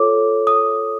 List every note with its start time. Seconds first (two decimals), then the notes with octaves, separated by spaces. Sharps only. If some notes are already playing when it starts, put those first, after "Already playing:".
Already playing: F4 A4 C#5 D6
0.47 D#6